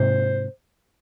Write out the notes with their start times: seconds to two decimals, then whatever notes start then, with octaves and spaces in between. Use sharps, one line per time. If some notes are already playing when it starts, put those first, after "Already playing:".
Already playing: G#2 C3 C5